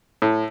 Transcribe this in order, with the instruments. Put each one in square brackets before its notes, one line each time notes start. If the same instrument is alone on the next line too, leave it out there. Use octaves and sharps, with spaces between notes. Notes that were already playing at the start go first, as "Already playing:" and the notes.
[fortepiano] A2